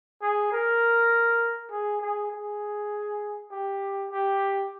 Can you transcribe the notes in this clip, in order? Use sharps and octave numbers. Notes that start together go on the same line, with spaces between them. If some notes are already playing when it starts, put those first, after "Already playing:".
G#4
A#4
G#4
G#4
G#4
G4
G4